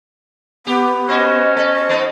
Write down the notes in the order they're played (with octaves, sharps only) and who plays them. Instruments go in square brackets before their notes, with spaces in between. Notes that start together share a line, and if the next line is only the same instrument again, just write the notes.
[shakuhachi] B3 [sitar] G4
[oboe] C#4 [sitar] F#4 C5 [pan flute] D#5
[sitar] A4 [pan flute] D#5
[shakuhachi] C5
[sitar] B3 D#4 A4